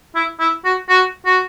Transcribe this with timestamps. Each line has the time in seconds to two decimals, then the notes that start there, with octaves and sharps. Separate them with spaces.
0.15 E4
0.40 E4
0.65 F#4
0.89 F#4
1.26 F#4